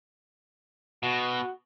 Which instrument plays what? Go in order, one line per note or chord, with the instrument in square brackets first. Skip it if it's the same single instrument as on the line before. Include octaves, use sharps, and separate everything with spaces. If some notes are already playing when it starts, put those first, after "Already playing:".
[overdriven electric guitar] B2 [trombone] F#4